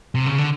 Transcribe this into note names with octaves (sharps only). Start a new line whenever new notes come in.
C3
C#3
D3